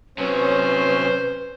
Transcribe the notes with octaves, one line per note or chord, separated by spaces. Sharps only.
C3 F#3 C#4 B4 C5